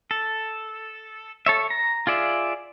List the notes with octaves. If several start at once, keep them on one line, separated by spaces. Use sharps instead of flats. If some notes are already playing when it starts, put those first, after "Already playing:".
A4
A4 C#5 E5
A#5
F4 G#4 D5 E5